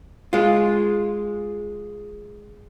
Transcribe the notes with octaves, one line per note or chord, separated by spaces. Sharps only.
G#3 F4